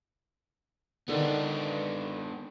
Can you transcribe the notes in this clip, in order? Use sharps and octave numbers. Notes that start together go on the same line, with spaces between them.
D3 D#3 B3 D4